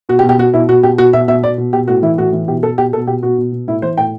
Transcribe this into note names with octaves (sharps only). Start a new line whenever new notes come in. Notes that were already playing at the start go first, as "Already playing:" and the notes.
B2 F#4
G4
B2
G4
B2 F#4
B2 E4
B2 F#4
B2 G4
B2 F#4
B2 E5
B2 E5
B2 D5
B2
B2 G4
A2 F#4
E3 E4
A2 F#4
E3
B2 G4
B2 A4
B2 G4
B2 A4
B2 G4
B2 F#4
B2
B2
A2 E4
E3 C5
A2 G5